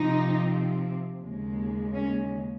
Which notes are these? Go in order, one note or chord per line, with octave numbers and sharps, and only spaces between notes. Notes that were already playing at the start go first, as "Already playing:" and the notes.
Already playing: C3 F3 C4 D#4
D#2 C#3 G#3
C#4